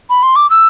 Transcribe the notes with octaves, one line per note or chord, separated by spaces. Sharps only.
B5
C6
D6
E6